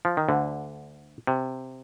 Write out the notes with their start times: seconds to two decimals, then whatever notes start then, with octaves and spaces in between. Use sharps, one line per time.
0.05 F3
0.17 D#3
0.28 D2 D3
1.27 C3